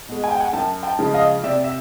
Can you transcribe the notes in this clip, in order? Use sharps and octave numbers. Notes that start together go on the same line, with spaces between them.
B2 G#3
G#5
G5
F#5 G#5
F#2 G5 A5
G5 A5
C#3 F3 G#3
D#5 F5
C3 D5 E5
E5